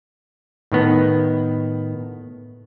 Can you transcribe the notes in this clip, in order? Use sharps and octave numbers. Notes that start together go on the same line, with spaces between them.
A2 D#3 B3